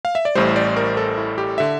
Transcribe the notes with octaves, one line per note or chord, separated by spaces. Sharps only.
F5
E5
D5
A1 A2 G3 C5
D5
A#4
A4
E4
G4
D3 E5